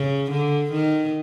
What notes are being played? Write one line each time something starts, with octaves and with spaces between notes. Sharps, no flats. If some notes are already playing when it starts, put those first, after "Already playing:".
Already playing: C#3
D3
D#3